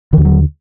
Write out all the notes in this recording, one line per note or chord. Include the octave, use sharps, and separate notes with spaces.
D#2 D3 E3
F#3